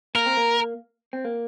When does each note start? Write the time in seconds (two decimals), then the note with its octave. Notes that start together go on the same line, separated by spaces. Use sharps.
0.15 A#3 A#4
0.26 C4
0.37 A#3
1.13 C4
1.25 A#3